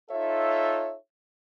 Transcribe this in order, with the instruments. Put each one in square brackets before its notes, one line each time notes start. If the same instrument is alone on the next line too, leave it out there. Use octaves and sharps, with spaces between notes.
[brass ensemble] D#4 F4 A4 C#5 E5